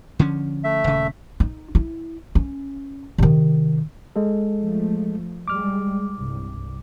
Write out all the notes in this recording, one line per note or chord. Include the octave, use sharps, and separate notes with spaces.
D3 F3 C#4
A3 E5
D#1 C#3
D#4
E4
C#4
C3 D#3
G#3 A4
F3 A3
G3 G#3 D6 F6
C2 G2